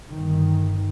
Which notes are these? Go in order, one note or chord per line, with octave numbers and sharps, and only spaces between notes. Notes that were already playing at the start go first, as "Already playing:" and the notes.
G1 G2 D#3